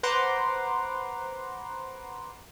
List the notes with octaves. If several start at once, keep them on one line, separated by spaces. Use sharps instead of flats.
B4 C5 F#5 A#5 C6 D6